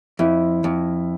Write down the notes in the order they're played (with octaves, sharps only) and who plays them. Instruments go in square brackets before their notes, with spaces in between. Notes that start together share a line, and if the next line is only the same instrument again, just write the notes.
[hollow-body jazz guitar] F2 [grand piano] E4
[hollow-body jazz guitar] F2